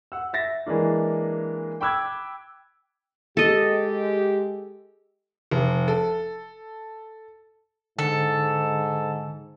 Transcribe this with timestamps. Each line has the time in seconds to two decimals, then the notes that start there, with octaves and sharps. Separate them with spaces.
0.12 F#5 E6
0.33 E5 A6 A#6
0.66 E3 G#3 A#3 D4
1.81 G5 B5 D6 E6 F#6 G#6
3.37 G#3 G4 A4 D#5
5.51 F1
5.88 A4
7.99 G#2 D3 A4